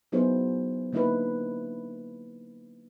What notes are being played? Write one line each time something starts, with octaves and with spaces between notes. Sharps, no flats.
F#3 B3 D#4 E4 G#4 C5
D3 A#3 D#4 E4 B4